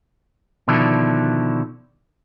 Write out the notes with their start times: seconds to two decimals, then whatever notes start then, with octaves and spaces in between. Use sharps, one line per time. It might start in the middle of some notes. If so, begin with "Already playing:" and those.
0.68 B2 D3 D#3 F3 D4 E4